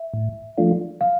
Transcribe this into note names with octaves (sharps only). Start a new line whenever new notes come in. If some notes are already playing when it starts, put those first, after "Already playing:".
Already playing: E5
A2
F3 A3 D4 F4
F5